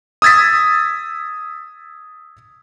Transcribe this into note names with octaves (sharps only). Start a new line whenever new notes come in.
D#6 E6 G#6 A6 B6